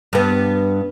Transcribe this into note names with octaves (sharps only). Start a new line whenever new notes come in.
G2 B3